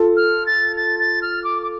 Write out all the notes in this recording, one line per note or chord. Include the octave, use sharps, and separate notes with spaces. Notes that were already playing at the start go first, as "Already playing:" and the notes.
Already playing: F4 A4
F6
A6
A6
A6
F6
D6
D6